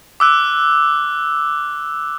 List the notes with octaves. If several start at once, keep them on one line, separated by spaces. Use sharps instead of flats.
D6 E6 F#6